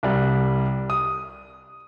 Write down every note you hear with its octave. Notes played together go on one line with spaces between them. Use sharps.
C2 G3
D#6